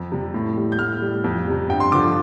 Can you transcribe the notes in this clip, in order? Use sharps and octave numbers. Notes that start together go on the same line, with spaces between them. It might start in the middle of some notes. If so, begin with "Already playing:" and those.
Already playing: F2
C3 G3
A2
G3
G6
A2 F6
G3
F2
C3 G3
G2 G5
C6
D3 F3 D6